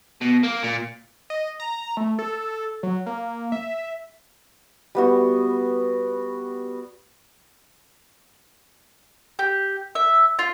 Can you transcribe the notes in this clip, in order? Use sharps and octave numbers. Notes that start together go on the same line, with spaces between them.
B2
A#3
A#2
D#5
A#5
A3
A4
F#3
A#3
E5
G3 B3 F#4
G4
E5
F4